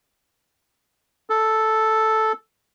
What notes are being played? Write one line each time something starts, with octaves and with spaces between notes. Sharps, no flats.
A4